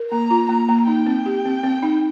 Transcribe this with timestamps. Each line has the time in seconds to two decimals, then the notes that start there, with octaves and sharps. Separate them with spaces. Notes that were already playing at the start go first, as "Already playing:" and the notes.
Already playing: A#4
0.11 A#3 A#5
0.30 F4
0.49 A#3 A#5
0.69 A#3
0.87 D#4 G5
1.06 C4
1.26 G4
1.45 C4
1.63 C4
1.83 D#4